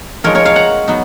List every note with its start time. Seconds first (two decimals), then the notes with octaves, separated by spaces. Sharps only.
0.24 F3 G#3 D#4 A#4 C#5
0.35 A#4 C#5
0.45 C#5 F5
0.56 F#5 A#5
0.88 F#3 B3 D#4